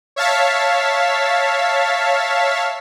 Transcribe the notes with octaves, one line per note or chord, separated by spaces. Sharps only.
C#5 E5 F5 A5 A6 B6